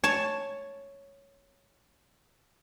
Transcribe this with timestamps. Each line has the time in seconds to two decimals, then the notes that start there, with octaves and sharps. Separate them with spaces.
0.04 C#5 A5